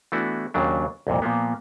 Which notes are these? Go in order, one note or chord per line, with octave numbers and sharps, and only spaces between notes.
E3 A3 B3 D4 E4 F#4
D#2 C#3 F#3 D4
C2 F2 A#2
A#2 F3 A#3 B3